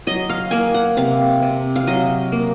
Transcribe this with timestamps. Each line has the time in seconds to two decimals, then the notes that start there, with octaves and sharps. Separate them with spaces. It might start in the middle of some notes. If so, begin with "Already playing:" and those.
0.07 F#3 D#5
0.29 F5
0.51 A#3 G#5
0.74 F#5
0.97 C3 F5
1.42 C3
1.76 F5
1.87 F#3 D#5
2.32 A#3